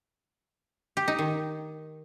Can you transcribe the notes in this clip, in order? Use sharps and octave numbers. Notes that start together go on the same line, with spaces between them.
G4
D#4
D#3